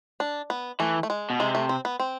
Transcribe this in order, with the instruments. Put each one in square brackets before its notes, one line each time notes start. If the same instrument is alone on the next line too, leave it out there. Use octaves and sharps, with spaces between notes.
[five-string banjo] D4
B3
[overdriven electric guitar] E3 [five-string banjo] A3
[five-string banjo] A3
G#3
[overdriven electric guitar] B2
[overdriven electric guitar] C3 [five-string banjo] G#3
[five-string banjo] A3
C4
B3
C4